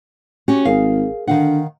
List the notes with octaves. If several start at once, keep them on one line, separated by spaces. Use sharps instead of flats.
C#4 F#4 G4
G#1 G#4 A#4 F5
D3 D#3 F5 F#5